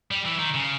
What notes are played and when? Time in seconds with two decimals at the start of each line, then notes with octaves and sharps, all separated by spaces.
0.11 G3
0.25 E3
0.39 D#3
0.54 C#3